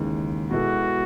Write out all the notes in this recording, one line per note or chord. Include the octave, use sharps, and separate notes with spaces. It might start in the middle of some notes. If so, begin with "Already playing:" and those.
Already playing: D#2 C#3 E3 G#3 D#4
B2 G#3 B3 E4 F#4 A4